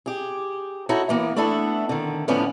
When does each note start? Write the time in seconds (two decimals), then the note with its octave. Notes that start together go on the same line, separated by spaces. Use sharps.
0.06 G4 G#4
0.89 D#4 E4 F#4 A4 C#5
1.09 E3 A#3 B3
1.36 A3 B3 D4 E4 A4
1.89 D3 D#3
2.28 A2 D3 F3 B3 C#4 D4